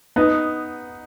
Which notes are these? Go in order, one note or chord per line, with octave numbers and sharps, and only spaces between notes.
B3 D#4